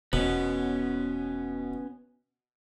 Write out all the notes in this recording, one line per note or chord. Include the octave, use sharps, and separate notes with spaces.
E1 B2 B3 C#4